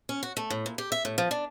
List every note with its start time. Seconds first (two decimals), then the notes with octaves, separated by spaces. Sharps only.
0.09 C#4
0.23 F#4
0.37 A3
0.50 A2
0.66 A#2
0.78 G4
0.92 E5
1.05 A2
1.18 F3
1.31 D4